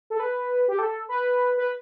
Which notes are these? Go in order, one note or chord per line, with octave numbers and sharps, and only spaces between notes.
A4
B4
G4
A4
B4
B4